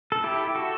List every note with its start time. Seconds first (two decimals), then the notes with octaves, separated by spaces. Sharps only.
0.12 A4
0.24 E4 G4
0.55 F#4 A4